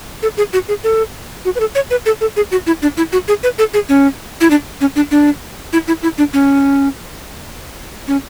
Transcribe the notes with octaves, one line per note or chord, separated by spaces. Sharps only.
A4
G#4
F#4
G#4
A4
F#4
B4
A4
C#5
B4
A4
A4
G#4
F#4
E4
D4
E4
F#4
G#4
B4
A4
G#4
C#4
E4
D4
C#4
D4
D4
E4
E4
E4
D4
C#4
C#4